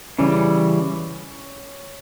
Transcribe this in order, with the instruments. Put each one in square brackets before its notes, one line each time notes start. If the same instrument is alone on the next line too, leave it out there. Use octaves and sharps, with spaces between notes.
[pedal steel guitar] C#3 E3 G3 [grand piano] C#4